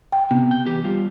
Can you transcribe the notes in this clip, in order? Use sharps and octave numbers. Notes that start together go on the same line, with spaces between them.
G5
C3 B3
G5
E3 G4
G3 F4